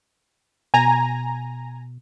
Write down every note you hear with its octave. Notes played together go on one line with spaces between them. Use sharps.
B2 G#5 A#5